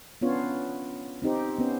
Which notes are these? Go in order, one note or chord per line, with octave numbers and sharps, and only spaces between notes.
B3 C#4 D4 F4 C#5
C4 D#4 G4 C5
B3 C#4 C5